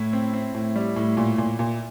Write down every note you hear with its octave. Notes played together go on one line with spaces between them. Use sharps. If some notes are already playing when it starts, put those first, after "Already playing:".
Already playing: A2 E4
C4
C4
A2
G3
A2
A#2
A#2
A#2